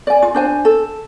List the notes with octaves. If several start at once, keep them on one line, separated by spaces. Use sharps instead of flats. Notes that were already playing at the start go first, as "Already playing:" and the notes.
D5 G#5
F4
D4 C5 G#5
A4